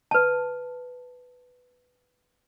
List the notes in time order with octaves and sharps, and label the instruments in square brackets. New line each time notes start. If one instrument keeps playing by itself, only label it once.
[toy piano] B4 A5